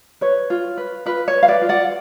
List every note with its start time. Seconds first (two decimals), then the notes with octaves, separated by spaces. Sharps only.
0.21 B4 C#5
0.50 F4
0.78 B4
1.06 F4 B4
1.28 C#5
1.34 B4
1.43 F5
1.48 B4 D5
1.62 F4
1.69 D5 F#5